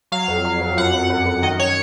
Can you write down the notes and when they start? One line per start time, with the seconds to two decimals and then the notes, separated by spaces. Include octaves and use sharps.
0.12 F#3 F5
0.28 F2
0.45 F#3
0.61 F2
0.77 F#2 F#5
0.94 F#2
1.10 F#2
1.26 F#2
1.42 D#3 D#5
1.60 D#3 C#5